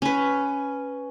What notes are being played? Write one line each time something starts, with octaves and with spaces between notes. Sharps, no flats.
C#4 B4